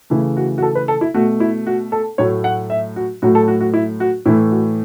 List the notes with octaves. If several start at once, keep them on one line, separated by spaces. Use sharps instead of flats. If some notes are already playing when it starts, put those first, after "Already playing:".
C#3 E3 A3 E4
F#4
F#4
A4
B4
A4
E4
B2 A3 F#4
E4
F#4
A4
A2 F#3 A3 C#5
F#5
E5
F#4
A2 F#3 A3 F#4
A4
F#4
F#4
E4
F#4
A2 E3 A3 E4
F#4